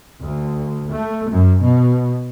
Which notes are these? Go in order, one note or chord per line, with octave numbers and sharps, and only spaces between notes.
D2
A3
F#2
B2